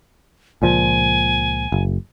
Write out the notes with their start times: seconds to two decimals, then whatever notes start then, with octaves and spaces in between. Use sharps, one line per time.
0.62 C#2 A#2 F3 G#5
1.72 F#1